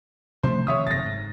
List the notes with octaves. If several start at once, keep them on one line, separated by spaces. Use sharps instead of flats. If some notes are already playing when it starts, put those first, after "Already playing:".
C3 F3 A3 C5
C3 D#3 F3 C#5 E5 D#6
F#1 G#2 A6 A#6
G#2